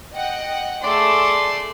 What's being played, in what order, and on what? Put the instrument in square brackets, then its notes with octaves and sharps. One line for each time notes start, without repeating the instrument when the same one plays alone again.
[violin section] D#5 F#5 G5
[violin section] A3 G#4 A4 [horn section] D5 C6